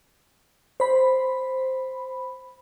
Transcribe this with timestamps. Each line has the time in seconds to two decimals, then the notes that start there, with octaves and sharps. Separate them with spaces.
0.80 C5 B5